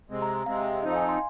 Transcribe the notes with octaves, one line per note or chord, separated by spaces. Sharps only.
C3 G#3 C4
A#5
C3 G#3 C4 F5
F2 F3 C4 D#4 D#5
F5
G#5
C6